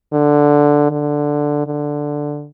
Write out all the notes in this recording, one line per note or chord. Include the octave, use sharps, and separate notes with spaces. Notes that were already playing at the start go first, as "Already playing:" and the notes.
D3
D3
D3